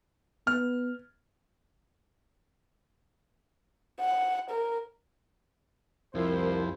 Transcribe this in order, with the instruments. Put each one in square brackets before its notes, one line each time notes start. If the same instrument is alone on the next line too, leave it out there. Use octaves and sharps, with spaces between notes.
[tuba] B3 [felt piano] F6
[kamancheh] F#5
A#4
[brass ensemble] C2 C5 [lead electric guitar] F2 [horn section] F3 E4 [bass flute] A#4